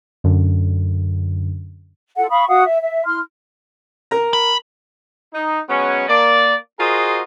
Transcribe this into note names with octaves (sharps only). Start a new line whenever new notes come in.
F#2 D3
F4 A4 F#5
F5 B5 C#6 D#6
F#4 F5 F#5 D#6
E5
E5
E4 C6 F6
A#4 A#5
B5
D#4
F#3 G#3 B3 C#4
A#3 D5
F4 F#4 G#4 A#4 C5 D#5